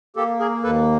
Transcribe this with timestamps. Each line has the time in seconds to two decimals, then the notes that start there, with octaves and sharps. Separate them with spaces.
0.16 A#3 G4 A4
0.39 G#4 A#4
0.63 D#2 A4 B4